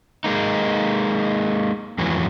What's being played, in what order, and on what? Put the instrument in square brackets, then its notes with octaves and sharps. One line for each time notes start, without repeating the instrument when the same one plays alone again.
[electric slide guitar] G#3 A#3 D#4
F2 A2 E3 F#3